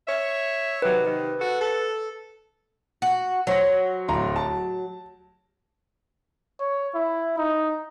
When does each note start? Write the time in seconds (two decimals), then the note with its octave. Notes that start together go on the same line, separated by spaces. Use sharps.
0.07 C#5 E5
0.82 C3 D#3 F#3 B4
1.04 C3 D#3
1.39 F#4 A4
1.60 A4
3.02 F#4
3.47 F#3 C5 C#5 A#6
4.08 D1 A#5 C6
4.36 A5
6.60 C#5
6.94 E4
7.38 D#4